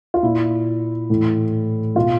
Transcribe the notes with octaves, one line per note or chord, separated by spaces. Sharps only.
F4
A#2 E4
A2 E3
B2 F4